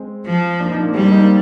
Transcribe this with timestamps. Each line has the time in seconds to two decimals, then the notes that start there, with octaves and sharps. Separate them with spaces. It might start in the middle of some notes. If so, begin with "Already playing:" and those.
Already playing: G#3 C4
0.26 F3
0.60 A#3 D4
0.71 C4 D#4
0.82 A#3 D4
0.94 G3 G#3 C4
1.03 A#3 D4
1.11 C4 D#4
1.20 A#3 D4